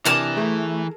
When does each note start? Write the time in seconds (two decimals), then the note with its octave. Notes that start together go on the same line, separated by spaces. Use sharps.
0.05 C3 E3 D4 A#4 A5 D6 D#6
0.37 A3 G#4 A4